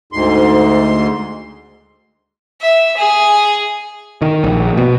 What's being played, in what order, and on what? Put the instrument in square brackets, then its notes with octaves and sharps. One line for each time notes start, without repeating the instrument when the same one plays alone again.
[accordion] D2 G#2 C6
[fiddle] E5
G#4
[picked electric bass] D#3
A#1
B2